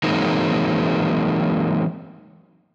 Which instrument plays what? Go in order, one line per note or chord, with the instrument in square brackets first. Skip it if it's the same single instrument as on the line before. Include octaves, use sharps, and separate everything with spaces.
[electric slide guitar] E3 F#3 G#3 A#3 C4 D#4